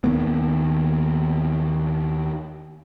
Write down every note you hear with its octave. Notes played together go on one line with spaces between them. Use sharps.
D#2 D#3 A#3 B3